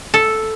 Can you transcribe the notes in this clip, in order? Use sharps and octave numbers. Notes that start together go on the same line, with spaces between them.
A4